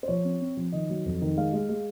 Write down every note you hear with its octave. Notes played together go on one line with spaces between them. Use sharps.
C5
F3 C#5
C4
C4
F3
D#3 D#5
F#3
F2
D#3
G#3 F5
G#3
G#3